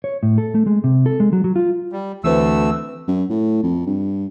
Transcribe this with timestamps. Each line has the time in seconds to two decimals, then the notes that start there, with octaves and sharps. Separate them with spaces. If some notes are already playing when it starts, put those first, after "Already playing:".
0.04 C#5
0.23 A2
0.38 A4
0.55 A3
0.67 G#3
0.84 C3
1.06 A4
1.20 G#3
1.33 F#3
1.44 F#3
1.56 F4
1.92 G3
2.24 D2 E3 A3 C4 B4 E6
3.08 F#2
3.30 A2
3.63 F2
3.87 G2